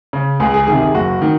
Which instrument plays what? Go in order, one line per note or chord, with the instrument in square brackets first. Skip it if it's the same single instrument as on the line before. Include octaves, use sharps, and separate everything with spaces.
[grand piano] C#3
C#2 G#4
G#4
C3 D#3 G#4
G#4
F#1 F#4
D#3